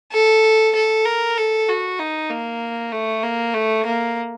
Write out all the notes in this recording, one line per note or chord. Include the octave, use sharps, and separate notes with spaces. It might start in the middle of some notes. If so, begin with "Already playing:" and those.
A4
A4
A#4
A4
F#4
D#4
A#3
A3
A#3
A3
A#3